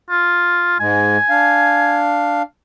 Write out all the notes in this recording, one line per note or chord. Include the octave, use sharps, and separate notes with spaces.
F4
G#2 G#3 G#5
D4 F5